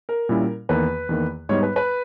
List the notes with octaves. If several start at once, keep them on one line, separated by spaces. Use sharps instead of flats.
A#4
A#2 G3 C#4 E4
E2 D#3 A#3 B4
E2 D#3 A#3
G#2 G3 B3 D#4 C#5
B4
B4